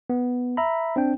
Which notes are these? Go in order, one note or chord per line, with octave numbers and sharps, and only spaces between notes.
B3
E5 A#5 B5
C4 D4 G5